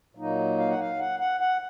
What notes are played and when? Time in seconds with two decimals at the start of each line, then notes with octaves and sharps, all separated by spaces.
0.15 A#2 F#3 A#3 D#4
0.58 F5
0.68 F#5
0.80 F5
0.99 F#5
1.19 F#5
1.40 F#5